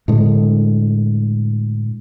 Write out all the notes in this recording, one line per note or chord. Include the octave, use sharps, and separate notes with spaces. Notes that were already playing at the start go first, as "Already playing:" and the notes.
A2 D3 G#3